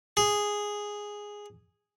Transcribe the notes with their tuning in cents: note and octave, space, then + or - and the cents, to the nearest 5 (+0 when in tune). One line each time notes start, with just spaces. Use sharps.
G#4 -5